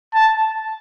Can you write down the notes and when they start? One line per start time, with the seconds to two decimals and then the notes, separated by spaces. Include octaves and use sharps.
0.14 A5